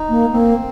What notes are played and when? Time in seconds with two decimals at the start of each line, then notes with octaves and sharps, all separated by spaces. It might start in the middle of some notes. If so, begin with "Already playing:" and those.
Already playing: D#4
0.10 A#3
0.33 A#3 C4